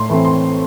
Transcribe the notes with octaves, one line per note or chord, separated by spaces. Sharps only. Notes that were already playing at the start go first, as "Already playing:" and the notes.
Already playing: A2 C6
E3 A3 C4
C6